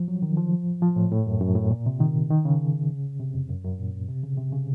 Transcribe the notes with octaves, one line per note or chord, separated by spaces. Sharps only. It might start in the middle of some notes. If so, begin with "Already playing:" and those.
Already playing: F3
F#3
D#3
F3
F3
A2
A2
F#2
F#2
A2
A#2
C3
D#3
D#3
C#3
C3
F2
F#2
F#2
A#2
C3
C#3
C3
C#3